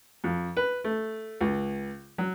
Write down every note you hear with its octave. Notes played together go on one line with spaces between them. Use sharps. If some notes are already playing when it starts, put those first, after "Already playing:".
F2
B4
A3
C#2
F#3